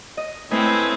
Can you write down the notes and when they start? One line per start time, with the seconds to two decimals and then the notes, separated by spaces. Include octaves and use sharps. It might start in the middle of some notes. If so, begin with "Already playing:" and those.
0.17 D#5
0.51 A2 A3 C4 B4 D#5 G#5